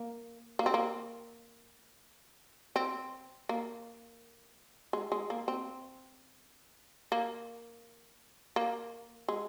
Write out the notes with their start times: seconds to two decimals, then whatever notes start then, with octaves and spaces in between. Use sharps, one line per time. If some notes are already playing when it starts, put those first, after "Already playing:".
Already playing: A#3
0.59 A#3
0.66 C4
0.74 A#3
2.76 C4
3.49 A#3
4.93 G#3
5.12 G#3
5.30 A#3
5.48 C4
7.12 A#3
8.56 A#3
9.28 G#3